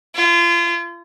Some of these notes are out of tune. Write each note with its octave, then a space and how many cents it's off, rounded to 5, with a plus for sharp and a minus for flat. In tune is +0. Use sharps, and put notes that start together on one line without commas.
F4 -35